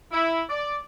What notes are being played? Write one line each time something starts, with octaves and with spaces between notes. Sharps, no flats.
E4
D5